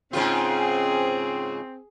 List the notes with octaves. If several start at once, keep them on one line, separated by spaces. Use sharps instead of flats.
G#2 C#3 C4 F4 G#4